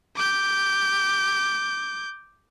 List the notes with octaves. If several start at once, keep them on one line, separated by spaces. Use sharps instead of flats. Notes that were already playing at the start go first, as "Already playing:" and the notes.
D6 G6